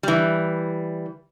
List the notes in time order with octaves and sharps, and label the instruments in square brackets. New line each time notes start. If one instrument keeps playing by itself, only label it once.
[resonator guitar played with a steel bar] E3 G3